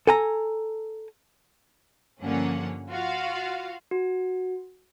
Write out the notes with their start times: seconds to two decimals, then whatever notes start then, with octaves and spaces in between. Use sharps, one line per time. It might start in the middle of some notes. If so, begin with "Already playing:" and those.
0.07 A4 G#5 A#5
2.20 G2 D3 F3 A#3 C#4 F#5
2.90 F4 F#4 F5
3.91 F#4